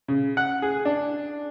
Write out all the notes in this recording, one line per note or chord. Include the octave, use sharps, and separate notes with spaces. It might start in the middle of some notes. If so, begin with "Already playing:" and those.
C#3
F#5
G#4
D4